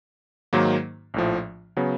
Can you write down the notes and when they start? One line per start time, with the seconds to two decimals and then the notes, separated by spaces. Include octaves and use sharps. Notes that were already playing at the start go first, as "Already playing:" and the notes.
0.53 G#2 D#3 F#3 A#3
1.14 A#1 A2 F3
1.77 C#3 F#3 B3